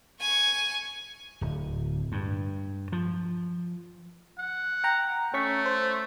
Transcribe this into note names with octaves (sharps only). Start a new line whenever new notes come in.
G#5 C#6
D1
G2
F3
F#5
G5 A#5
A3 C#4 C#6 B6
C5